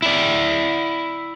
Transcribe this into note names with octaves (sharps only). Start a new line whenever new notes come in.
E4 D5